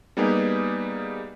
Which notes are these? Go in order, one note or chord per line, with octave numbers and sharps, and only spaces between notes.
G3 A#3 B3 D#4 G4 G#4